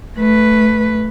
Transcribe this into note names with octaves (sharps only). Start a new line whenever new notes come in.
A3 B4